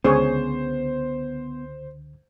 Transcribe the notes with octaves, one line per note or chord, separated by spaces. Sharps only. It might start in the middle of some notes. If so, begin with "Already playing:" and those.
C#2 D3 B3 C#4 G#4 C5 C#5